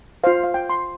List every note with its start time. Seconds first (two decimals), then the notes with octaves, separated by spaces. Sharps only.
0.24 F4 C5 F5
0.44 F5
0.54 G5
0.70 C6